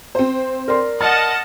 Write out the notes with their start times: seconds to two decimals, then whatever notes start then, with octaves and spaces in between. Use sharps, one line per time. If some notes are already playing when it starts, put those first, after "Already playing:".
0.15 C4 C5
0.68 A#4 D5 C6
1.01 D#5 F#5 A5 F6 A6